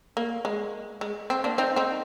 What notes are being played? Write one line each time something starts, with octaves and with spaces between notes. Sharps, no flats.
A#3
G#3
G#3
C4
A#3 D4
C4 D#4
C4 D#4